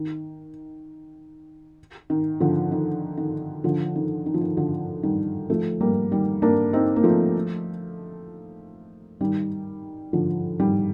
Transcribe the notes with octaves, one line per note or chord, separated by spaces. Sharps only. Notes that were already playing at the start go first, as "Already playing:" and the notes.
Already playing: D#3
D#3
D3 F3
D#3
D#3
D3 F3
D#3
D#3
F3
D#3
D3 F3
D#3 G3
F3 A3
G3 A#3
D#3 G3
A#3 D4
C4 D#4
A#3
F3 A3
D#3 G3
D3 F3
D#3 G3